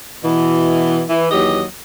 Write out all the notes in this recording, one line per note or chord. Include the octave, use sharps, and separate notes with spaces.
B2 E3
E3
D#2 E3 F#3 G4 D#5